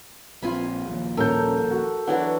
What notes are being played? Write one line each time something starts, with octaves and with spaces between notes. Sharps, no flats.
A#1 C4 F4 G#5 B5
A#1 D#2
D#1 C#4 A4 A#4 G6
F#4
E3 F#3 D4 F#5